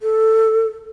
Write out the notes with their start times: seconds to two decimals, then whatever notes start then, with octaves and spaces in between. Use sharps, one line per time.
0.01 A4